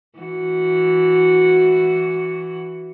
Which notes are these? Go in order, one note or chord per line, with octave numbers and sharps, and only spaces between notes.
E3 F#4